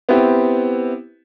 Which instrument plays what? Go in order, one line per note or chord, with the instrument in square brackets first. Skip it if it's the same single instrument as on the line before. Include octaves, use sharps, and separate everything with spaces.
[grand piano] B3 C4 E4 G4